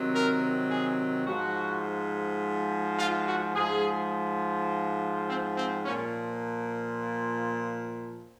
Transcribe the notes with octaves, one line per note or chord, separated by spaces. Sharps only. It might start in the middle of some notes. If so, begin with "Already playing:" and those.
Already playing: C3 D#3 F#3
A#4
G#4
G#2 F3 F#4
F4
F#4
G#2 F3 G#4
C4
C4
A#2 F3 C#4